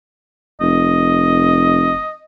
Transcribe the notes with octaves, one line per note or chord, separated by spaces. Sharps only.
F1 D#5